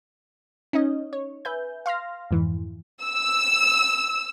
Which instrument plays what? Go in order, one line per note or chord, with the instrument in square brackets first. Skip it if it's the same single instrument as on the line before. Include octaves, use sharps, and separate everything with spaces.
[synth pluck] C#4 D#4 D#5
C#5
B4 E5 G#5 G6
F5 C6 F6 A#6
F2 G#2 E3
[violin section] E6